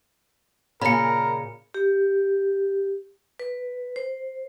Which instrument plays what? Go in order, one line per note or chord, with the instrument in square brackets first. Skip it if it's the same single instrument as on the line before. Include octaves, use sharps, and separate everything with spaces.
[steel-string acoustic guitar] A#2 C#3 [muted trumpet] A#4 [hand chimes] B5 C#7
[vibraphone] G4
B4
C5